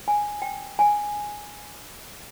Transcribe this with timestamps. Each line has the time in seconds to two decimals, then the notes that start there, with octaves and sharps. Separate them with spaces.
0.08 G#5
0.42 G5
0.79 G#5